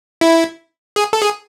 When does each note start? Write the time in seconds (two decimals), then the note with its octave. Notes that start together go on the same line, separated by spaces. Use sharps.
0.21 E4
0.96 G#4
1.13 A4
1.22 G#4